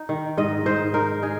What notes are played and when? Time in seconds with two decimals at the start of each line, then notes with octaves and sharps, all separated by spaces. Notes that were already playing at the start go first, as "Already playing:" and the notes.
Already playing: D#4
0.09 D#3
0.37 G#2 D#5
0.66 G#2 C5
0.94 D#4 A#4
1.22 D#4 G#4